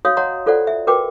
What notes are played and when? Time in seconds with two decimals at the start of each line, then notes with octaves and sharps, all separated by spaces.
0.05 F#4 C#5 F5 D#6
0.17 C#5 D#5 F#5 A#5 C6
0.46 F4 A4 C5 D5 F#5
0.67 E5
0.87 F#4 A#4 B4 G5 D6